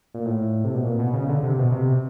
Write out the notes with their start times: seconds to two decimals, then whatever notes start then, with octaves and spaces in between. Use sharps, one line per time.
0.14 A#2
0.25 A2
0.64 C3
0.74 B2
0.84 A#2
0.99 B2
1.13 C#3
1.29 D3
1.43 C3
1.58 B2
1.72 C3